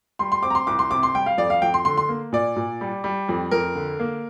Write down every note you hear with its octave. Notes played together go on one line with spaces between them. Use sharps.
G3 C6
C6
C4 D6
A#5
C6
C2 D6
C6
C3 D6
C6
G3 G5
F5
F2 D5
F5
F2 G5
C6
D3 C6
C6
A#3
A#2 D5
A#2
G3
G3
F2
F2 A#4
D3
A#3